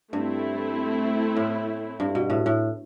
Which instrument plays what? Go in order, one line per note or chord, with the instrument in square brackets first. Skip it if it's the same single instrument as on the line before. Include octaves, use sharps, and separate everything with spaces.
[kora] G2 [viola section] A3 C4 E4
[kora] A2
G2
B2
A2
A2